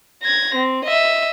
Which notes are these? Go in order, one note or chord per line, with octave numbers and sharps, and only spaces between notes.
G#6 A#6
C4
D#5 E5